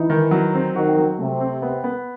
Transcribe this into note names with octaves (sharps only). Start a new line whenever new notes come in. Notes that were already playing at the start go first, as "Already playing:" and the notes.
Already playing: E3 D#4
D#3
F#3
C4
D#3 F#4
F#3
C3 A3
C4
B3
B3